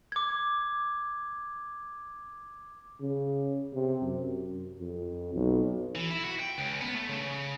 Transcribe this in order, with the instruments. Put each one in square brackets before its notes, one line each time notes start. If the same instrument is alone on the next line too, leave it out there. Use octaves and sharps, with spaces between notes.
[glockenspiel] D6 G#6
[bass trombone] C#3
C3
F#2
F2
B1
[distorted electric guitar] E3
E4
F#4
G5
C#2
B3
A3
C#3